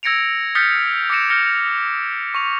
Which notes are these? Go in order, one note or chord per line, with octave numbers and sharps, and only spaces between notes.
E6 G#6 A#6 C#7 D7 F7
D#6 F6 G6 A6 B6 C#7
D6 D#6 A#6 C#7 D7 E7
F6 G6 A#6 C#7 E7
C#6 F7